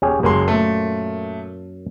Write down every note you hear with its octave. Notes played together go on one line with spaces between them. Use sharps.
D#1 C#4 G4 G#4
F#1 F#2 G#3 A#3 C6
A#2 A3